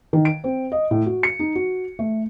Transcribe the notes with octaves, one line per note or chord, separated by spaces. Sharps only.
D#3
D7
C4
D#5
A2
F#4
C#7
D#4
F#4
A3